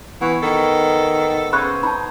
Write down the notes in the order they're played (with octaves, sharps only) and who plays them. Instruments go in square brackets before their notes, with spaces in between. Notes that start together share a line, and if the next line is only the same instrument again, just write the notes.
[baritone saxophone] E3 [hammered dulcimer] B3 C#5
[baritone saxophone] D#3 [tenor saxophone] A4
[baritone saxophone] C#3 [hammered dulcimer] C5 C#5 D#5 [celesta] B5 F#6
[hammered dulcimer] D#4 [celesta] A5 B5